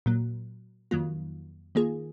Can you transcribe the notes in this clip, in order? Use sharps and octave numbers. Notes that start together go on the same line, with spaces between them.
A#2 F#3 A#3
F2 D#3 F#3 A#3 F4
D#3 A#3 F4 G#4